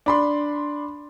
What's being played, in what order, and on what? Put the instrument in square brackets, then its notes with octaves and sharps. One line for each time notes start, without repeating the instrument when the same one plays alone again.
[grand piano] D4 B5 C6